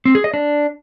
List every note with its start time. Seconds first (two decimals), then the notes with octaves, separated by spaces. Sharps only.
0.05 C4
0.15 G#4
0.24 D#5
0.34 D4